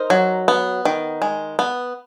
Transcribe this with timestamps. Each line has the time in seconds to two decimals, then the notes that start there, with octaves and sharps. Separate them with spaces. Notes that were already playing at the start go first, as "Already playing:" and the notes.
Already playing: D#4 A#4 C5
0.10 F#3
0.48 B3
0.85 D#3
1.22 G#3
1.59 B3